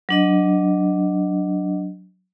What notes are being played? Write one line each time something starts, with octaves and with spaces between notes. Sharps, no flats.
F#3 D4 D#5